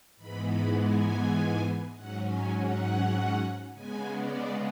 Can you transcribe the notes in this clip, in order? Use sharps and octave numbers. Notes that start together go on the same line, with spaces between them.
G#2 E3 G#3 B3 B5
B5
G#5
G#2 F#3 C#4 F#5
G#5
F#5
C#3 G#3 B3 G#5
D5